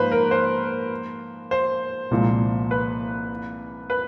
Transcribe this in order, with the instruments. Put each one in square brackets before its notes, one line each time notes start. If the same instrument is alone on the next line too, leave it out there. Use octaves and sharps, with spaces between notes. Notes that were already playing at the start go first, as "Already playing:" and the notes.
Already playing: [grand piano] G#2 F3 A#3 [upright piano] B4 C5
[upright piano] A#4
C5
C5
[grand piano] C2 A#2 F3 G#3
[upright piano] B4
B4